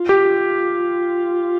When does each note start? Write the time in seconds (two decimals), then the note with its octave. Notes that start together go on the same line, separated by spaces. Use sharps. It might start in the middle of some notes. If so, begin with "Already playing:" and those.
Already playing: F4
0.09 G4